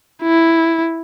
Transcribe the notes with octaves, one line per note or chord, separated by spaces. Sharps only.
E4